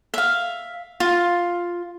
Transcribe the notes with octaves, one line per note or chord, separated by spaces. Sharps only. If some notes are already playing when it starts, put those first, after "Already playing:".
E5 F5
F4